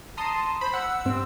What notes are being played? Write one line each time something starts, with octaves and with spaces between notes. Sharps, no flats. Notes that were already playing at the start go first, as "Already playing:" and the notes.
A5 A#5 C6 D#6
C5 B5
F#5 E6
G2 C4